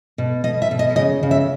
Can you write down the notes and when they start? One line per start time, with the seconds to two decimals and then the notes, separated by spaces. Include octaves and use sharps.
0.18 B2
0.44 B2 D#5
0.62 E5
0.71 B2
0.79 D#5
0.96 C#3 D#5
1.23 C#3
1.31 E5